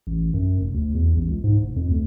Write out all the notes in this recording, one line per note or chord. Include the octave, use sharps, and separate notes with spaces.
A1
F#2
F1
D2
E2
A1
C#2
G#2
F1
F2
D2